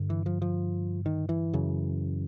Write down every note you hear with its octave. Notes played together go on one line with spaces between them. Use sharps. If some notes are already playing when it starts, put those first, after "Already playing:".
Already playing: G2 D3
E3
F3
F3
D#3
E3
F#2 C#3